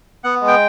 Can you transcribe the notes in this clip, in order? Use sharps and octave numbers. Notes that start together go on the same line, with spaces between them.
B3 F#5
G#3
G5